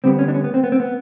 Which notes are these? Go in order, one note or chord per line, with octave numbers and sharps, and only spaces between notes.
D3 G3 B3 C4
C#4
D4
C#4
B3
C4
B3
C4
B3